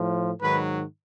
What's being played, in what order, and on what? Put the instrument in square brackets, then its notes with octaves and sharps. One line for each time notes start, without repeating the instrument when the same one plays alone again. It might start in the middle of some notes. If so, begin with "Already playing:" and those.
Already playing: [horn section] A2 F3
G#2 D#3 F#3 B4